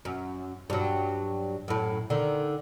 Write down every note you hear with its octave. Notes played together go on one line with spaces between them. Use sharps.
F#2
G2 F#3
F#2 A2
D3 D#3